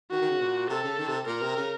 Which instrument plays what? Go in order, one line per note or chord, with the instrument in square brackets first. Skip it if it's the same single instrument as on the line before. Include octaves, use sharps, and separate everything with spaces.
[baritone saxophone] D#3 [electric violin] F#4
[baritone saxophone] D#3
C#3
A#2
[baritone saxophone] C3 [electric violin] A4
[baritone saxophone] C#3
D#3
C3
[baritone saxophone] A#2 [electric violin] A#4
[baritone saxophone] C3
C#3